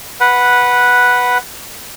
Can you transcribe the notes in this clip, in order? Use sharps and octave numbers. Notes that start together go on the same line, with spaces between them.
B4 F#5